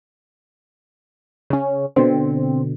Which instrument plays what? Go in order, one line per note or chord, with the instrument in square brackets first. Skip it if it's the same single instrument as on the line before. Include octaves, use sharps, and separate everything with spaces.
[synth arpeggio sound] C#3 C#4
[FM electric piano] B2 D3 [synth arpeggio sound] C4